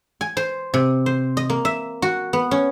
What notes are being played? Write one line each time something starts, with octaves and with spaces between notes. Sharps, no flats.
G#5
C5
C3
C5
D#5
A#3
E5
F#4
B3
C#4